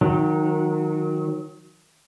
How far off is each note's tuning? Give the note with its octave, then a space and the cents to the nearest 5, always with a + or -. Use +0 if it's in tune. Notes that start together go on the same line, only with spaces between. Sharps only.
D#3 +0 F#3 -25